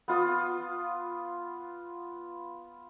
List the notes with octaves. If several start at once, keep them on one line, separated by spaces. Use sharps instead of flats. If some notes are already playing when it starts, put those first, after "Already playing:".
B3 F4 D#6